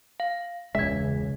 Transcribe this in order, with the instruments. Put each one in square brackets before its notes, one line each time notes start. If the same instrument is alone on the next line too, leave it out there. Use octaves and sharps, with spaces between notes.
[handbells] F5
[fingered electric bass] E1 G#3 [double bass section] C#2 C#3 [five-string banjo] E5 [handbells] G#6 B6